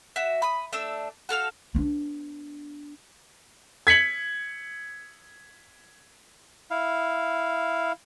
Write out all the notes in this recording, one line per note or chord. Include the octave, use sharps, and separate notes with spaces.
F#4 E5
B5 D#6
A3 D4 E6
F#4 A4 F5 F6
B3 D4
G#6 B6 C#7 F#7
E4 F5